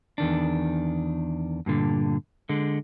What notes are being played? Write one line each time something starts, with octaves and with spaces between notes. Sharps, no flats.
E2 D#3 D4
G2 A#2 D3
D3 G#3